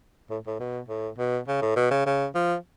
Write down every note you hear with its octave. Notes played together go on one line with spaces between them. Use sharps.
A2
A2
B2
A2
B2
C#3
A2
B2
C#3
C#3
F3